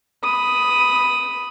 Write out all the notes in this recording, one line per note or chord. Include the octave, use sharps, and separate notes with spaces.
B5 D#6